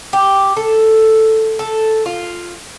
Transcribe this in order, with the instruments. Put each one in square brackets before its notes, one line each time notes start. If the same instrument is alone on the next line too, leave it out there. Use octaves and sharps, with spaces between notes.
[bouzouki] G4
A4
A4
F4